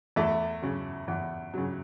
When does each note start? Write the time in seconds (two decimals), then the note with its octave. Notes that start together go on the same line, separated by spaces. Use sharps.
0.16 E2 A3
0.62 C#3 F#3
1.08 E2
1.54 C#3 F#3